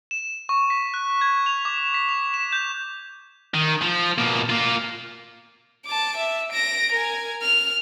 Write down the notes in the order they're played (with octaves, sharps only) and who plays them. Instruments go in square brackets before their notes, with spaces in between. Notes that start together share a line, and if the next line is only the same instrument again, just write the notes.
[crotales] E7
C#6
B6
F#6
G#6
F7
D6
B6
F7
E7
G6
[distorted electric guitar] D#3
F3
B2 A#3
A#3 F4
[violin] A5 D6
E5
A#6 D7
A#4 G#5
F6